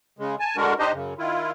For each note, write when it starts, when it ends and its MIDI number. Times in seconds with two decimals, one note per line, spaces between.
0.19 0.35 49
0.19 0.35 56
0.40 0.56 80
0.40 0.56 81
0.57 0.74 50
0.57 0.74 56
0.57 0.74 62
0.57 0.74 66
0.57 0.74 70
0.79 0.92 62
0.79 0.92 63
0.79 0.92 67
0.79 0.92 72
0.79 0.92 75
0.93 1.14 42
0.93 1.14 49
1.18 1.51 51
1.18 1.51 64
1.18 1.51 65